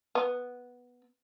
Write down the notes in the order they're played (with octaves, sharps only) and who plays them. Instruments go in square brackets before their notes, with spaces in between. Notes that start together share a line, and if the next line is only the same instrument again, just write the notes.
[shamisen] B3